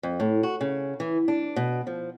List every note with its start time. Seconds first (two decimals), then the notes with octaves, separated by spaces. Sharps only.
0.03 F2
0.20 A2
0.43 F#4
0.61 C#3
1.00 E3
1.28 D4
1.56 B2
1.87 F3